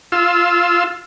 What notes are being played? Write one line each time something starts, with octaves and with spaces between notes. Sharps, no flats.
F4 E6